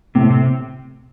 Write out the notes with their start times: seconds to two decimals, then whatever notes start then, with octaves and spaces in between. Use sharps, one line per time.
0.15 A2 C3
0.30 C3